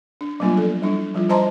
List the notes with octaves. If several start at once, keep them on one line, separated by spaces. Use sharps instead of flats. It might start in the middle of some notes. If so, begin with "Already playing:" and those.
D4
F#3 G3 A#3 B3 D4 F4
F3 A4
G3 D4 E4
F3 G3 F4
G3 C5 D#5 A5 A#5 C6